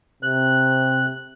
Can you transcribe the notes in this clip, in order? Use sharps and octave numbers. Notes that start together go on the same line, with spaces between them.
C3 F#6